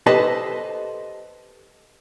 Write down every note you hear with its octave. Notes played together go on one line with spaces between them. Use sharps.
G4 A4 B4 C5 D#5 A5